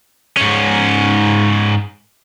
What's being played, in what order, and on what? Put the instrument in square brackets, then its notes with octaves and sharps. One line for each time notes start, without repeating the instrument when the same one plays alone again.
[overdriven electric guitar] G#2 C#4